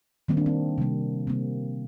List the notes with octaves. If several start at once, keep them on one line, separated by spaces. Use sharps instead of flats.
D#3 G3 A#3 C4
D4
C4
C3 G3 A#3
C3 G3 A#3 C4